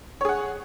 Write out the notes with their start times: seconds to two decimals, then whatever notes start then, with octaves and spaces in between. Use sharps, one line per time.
0.21 C#5
0.25 G#4
0.29 F#5